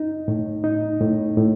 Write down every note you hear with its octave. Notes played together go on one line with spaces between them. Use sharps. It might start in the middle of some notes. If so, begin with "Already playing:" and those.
Already playing: D#4
A2
D#4
A2
A2